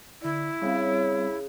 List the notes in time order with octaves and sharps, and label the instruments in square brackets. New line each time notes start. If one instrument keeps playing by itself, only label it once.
[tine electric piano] D3 D5 [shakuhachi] E4
[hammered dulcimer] C#3 [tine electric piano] G3 C4